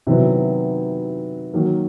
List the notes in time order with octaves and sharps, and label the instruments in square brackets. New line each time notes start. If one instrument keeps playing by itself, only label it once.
[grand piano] C3 D#3 F#3 B3 E4
D#3 F#3 A#3